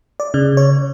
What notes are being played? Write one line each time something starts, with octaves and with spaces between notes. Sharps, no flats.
D5
C#3
C#5